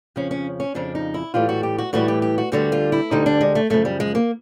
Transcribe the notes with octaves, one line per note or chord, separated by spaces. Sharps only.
F2 C#3 F3 C#4
C#4
C#4
F2 C#3 F3 D4
D#4
E4
A2 E3 G3 F4
F#4
G4
F#4
A2 E3 G3 F#4
G4
G4
F#4
D2 D3 G3 F#4
F4
E4
D2 D3 G3 D#4
D4
G#3
A3
F#2 C#3 F3 A3
G3
G#3
A#3